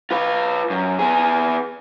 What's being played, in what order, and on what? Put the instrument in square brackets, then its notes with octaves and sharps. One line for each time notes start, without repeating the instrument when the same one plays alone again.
[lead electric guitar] F4 B4
F#2
B3 G#4